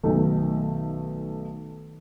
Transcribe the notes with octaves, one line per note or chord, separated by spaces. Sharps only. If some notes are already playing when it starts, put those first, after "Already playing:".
B1 D#3 A3